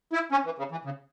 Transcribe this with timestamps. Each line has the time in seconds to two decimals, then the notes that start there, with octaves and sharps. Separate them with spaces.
0.13 E4
0.32 C#4
0.45 E3
0.58 C#3
0.71 E3
0.85 C#3